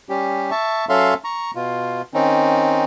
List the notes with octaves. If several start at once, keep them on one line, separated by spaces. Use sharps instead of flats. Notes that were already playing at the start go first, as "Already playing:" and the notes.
G3 C#4 G4
E5 A5 C#6
F#3 C#4 A4 E5 F5 C6
A#5 C#6
B2 F4
D#3 C4 C#4 D#4